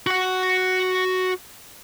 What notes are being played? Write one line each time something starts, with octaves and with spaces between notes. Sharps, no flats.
F#4 F#5